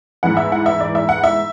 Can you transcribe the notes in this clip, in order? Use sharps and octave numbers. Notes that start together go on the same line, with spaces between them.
G#2 E3 F#5
E5
F#5
E5
D5
E5
F#5
E5